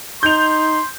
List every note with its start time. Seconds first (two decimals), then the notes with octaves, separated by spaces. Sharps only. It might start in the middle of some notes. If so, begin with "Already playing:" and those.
0.23 D#4 C6 G6 F7